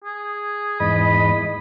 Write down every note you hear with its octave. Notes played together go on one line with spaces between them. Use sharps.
G#4
E2 G#2 D#5 B5